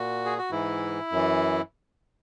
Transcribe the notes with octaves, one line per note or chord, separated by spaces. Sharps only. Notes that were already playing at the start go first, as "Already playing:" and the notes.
Already playing: A#2 F#4
G#4
F#4
G#2 E3 E4
F#2 E3